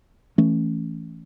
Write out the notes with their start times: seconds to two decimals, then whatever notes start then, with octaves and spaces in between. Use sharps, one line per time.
0.38 E3 A3 C#4